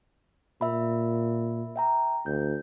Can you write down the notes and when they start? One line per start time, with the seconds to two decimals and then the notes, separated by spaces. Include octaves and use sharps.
0.61 A#2 E5 B5
1.76 E5 G5 A#5
2.26 D2 G6